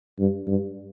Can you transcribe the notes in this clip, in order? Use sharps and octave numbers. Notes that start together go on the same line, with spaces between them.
G2
G2